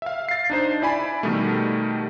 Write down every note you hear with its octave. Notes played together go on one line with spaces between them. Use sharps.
E5 F5
A6 C7
D4 D#4 C5
E4 D5 G#5 B5
B2 D#3 G3 A3